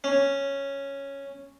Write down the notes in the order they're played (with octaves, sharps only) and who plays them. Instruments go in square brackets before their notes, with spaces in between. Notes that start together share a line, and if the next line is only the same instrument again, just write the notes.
[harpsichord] C#4